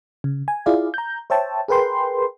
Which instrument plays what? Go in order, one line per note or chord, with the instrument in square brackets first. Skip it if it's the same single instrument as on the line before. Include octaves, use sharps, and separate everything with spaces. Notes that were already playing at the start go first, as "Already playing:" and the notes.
[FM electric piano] C#3
G#5
E4 F4 G#4 D5 F5
A#5 G6
C5 C#5 E5 G5 A5
G#4 A#4 B4 G5 C6